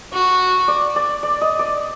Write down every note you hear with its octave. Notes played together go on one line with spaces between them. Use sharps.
F#4
D5
D5
D5
D#5
D5